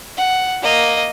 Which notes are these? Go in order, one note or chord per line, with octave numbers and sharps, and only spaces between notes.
F#5
A#3 D#5